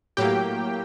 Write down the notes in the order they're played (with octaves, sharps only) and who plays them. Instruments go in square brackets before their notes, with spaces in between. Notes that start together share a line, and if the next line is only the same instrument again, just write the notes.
[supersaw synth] A2 F#3 A#3 G4 G5